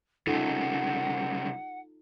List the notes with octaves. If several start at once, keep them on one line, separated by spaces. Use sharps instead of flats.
C2 C#3 D#4 F4 A4 F#5